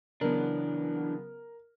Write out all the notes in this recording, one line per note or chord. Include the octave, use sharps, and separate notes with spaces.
C#3 E3 F#3 B3 D4 A#4